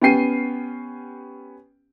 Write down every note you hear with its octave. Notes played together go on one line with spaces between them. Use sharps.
B3 C#4 G4 G5 C7 D#7